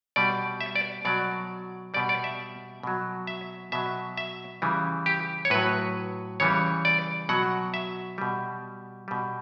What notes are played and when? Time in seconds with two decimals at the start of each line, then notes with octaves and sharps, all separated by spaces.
0.16 B2 G3 D5
0.61 E5
0.76 D5
1.05 B2 F#3 D5
1.94 B2 G3 D5
2.09 D5
2.24 E5
2.83 B2 F#3
3.27 E5
3.72 B2 F#3 E5
4.17 E5
4.62 C#3 E3 G3
5.06 G4
5.45 C#5
5.50 A2 F#3 B4
6.40 C#3 E3 G3 C#5
6.85 D5
7.29 B2 F#3 F#5
7.74 E5
8.18 B2 G3
9.08 B2 G3